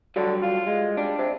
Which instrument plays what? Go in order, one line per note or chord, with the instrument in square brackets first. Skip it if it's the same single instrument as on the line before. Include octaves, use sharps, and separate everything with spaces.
[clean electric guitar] G2 F#3 G3 [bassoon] D3
[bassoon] F4
[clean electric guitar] G#3
[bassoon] G3 [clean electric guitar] D4
[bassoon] C3